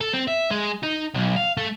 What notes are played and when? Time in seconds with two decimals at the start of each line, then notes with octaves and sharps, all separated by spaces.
0.01 A4
0.14 C4
0.28 E5
0.51 G#3
0.83 D#4
1.14 B1
1.36 F5
1.58 A3